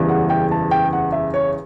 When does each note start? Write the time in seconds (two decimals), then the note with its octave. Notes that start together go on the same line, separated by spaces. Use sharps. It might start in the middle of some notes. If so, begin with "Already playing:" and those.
Already playing: F#1 E2 C#3 E3 G3
0.09 F#5
0.30 G5
0.51 A5
0.71 G5
0.93 F#5
1.12 E5
1.34 C#5